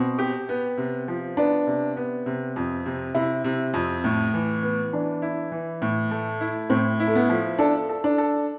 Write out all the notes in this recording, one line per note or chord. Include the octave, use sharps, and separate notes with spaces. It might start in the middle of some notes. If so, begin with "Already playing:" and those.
Already playing: B2 C4
G4
B3
C3
F3
B3 D4
C3
B3
C3
F2
C3
C3 E4
C3
F2
A2
E3
B3
E3 D4
E4
E3
A2
A3
E4
A2 C4
E4
A3
B3
F3
D4 A4
A4
D4
A4